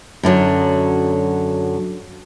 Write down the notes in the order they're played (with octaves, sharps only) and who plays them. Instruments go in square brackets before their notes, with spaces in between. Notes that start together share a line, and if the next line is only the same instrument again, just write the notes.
[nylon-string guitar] F#2 D3 F3 F#3